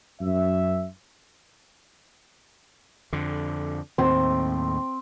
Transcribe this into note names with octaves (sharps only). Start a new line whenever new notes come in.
F#2 E5
F2 D3
D#2 A2 C4